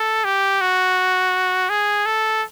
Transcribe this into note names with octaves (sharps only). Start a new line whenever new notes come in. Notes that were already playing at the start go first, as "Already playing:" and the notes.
Already playing: A4
G4
F#4
G#4
A4